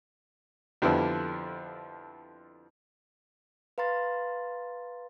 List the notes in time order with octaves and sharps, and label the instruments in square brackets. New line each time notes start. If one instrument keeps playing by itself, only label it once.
[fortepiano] F2 D3 F3 G3 B3 E4
[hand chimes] B4 F5 A#5 C6 A6